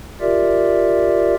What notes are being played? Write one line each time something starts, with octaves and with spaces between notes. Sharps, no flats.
F4 G4 A#4 D5 E5